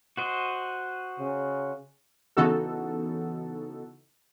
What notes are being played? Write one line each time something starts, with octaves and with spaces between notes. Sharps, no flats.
F#4 C5 D#5
C#3
C#3 E3 B3 D#4 F#4 A4